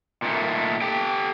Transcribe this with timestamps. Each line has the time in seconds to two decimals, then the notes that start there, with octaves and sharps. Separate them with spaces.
0.22 A#2 D#3 A3
0.81 G4 A4 G5